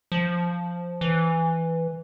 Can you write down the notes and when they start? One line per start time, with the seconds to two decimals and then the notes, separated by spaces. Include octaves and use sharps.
0.12 F3
1.01 E3